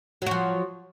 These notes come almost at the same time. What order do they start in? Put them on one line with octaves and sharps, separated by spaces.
F#3 F#4 F3